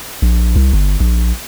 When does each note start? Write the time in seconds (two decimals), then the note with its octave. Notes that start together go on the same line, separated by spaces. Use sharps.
0.22 A#1
0.56 C2
0.73 G1
1.00 A#1